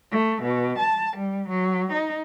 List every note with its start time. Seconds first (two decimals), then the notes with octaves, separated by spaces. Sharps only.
0.11 A3
0.42 B2
0.78 A5
1.17 G3
1.48 F#3
1.92 D#4